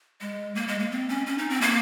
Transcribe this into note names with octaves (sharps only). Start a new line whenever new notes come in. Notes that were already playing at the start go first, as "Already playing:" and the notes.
G#3
A#3
G#3
A#3
C4
C#4
C#4
D#4
C4
A#3